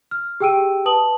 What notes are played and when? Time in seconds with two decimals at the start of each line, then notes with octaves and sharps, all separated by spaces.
0.11 F6
0.40 G4 G#4 G5 E6 D7 D#7
0.85 B4 A5 D#6 F#7